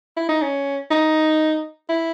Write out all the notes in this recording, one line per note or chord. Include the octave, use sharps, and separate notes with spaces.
E4
D#4
C#4
D#4
E4